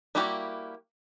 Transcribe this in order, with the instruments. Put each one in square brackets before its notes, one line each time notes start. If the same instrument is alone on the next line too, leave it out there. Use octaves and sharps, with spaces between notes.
[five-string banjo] G3 A#3 E4 F#4 G4